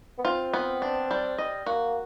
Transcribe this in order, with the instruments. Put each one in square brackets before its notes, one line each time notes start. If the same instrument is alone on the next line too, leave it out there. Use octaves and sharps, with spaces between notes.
[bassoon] B3
[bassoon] C4 [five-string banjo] F4
[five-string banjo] B3
D4
G3
D#5
[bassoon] A#3 [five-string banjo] F#4